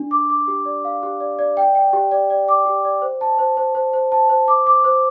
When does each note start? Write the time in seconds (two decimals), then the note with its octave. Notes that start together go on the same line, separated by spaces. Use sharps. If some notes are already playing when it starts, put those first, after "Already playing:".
Already playing: D4
0.11 D6
0.30 D6
0.48 G4
0.65 D5
0.85 F5
1.03 G4
1.20 D5
1.39 D5
1.57 G5
1.75 G5
1.93 G4
2.11 D5
2.30 D5
2.48 D6
2.66 G4
2.85 D5
3.02 C5
3.21 A5
3.39 C5
3.57 C5
3.75 C5
3.93 C5
4.12 A5
4.29 C5
4.48 D6
4.67 D6
4.84 C5